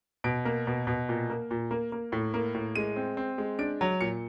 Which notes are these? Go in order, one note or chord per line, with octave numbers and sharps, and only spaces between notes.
B2 D7
A#3
B2
B2
A#2
A#3
A#2
A#3
A#3
A2
A#3
A2
G#3 D#7
C4
C4
G#3
D4 D7
F#3
A#2 C#7